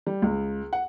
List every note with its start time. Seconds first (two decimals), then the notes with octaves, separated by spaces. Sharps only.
0.07 G3
0.22 C#2
0.73 F#5